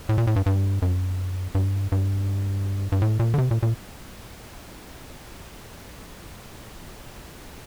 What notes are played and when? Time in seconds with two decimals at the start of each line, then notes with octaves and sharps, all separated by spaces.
0.09 A2
0.18 A#2
0.27 A2
0.36 G2
0.46 G2
0.82 F#2
1.55 G2
1.92 G2
2.92 G2
3.02 A2
3.20 A#2
3.34 D3
3.38 C3
3.51 A#2
3.63 A#2